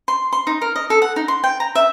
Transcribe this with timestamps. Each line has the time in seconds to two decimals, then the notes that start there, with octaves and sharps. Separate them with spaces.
0.08 C6
0.33 C6
0.47 D#4
0.61 A#4
0.76 D#5
0.90 A4
1.02 F#5
1.16 D#4
1.28 C6
1.44 G5
1.60 A#5
1.75 E5